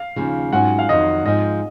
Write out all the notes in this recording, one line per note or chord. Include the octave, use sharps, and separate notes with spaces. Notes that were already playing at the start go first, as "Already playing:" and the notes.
Already playing: F5
D#2 C#3 F3
G#2 F#3 C#4 F4 F#5
F5
F2 D#3 F#3 D#5
G#2 F3 C4 D#5